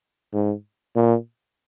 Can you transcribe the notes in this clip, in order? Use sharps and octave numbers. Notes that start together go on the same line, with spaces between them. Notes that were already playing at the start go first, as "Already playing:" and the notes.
G#2
A#2